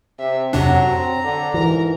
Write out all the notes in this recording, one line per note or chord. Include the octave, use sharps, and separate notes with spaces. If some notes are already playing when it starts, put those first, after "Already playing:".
C3 E5
F2 C3 F#3 D4 A#5
C4
D3
G#2 E3 A#4 A#5